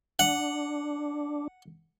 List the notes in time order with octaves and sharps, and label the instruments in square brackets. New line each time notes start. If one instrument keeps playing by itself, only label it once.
[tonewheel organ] D4 [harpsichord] F#5